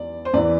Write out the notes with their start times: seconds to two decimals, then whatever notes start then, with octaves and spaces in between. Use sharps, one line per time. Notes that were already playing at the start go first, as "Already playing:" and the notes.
Already playing: E2 D5
0.25 C5
0.33 E2 E3 D5